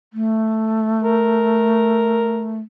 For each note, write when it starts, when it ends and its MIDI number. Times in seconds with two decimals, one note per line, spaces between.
0.13 2.60 57
1.04 2.57 70